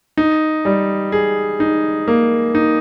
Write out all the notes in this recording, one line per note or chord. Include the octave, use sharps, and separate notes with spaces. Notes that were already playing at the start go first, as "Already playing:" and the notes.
D#4
G3
G#4
D#4
A#3
D#4